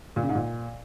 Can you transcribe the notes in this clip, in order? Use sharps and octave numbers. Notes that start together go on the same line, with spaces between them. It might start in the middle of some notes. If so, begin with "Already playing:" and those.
A#2
C#3
G#2
A#2